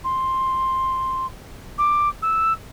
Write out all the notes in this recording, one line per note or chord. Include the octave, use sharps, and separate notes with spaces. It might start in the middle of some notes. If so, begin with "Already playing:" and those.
C6
D6
E6